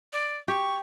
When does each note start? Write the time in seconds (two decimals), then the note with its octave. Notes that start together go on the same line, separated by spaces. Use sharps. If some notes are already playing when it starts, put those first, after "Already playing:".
0.13 D5
0.48 G4 C#6